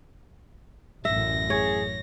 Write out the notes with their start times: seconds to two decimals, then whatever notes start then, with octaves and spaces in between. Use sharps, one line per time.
1.05 A1 F#2 E5 A#6
1.50 G#4 C#5